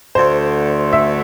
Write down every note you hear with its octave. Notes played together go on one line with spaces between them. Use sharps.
D2 D3 A3 C5
E5